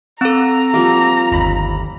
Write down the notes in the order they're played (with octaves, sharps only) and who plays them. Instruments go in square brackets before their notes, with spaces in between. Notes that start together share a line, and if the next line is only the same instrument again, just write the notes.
[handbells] C4 A4 [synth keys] F#5 E6 [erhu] A#5
[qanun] F3 G3 A#3
[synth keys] G1 D#2 B5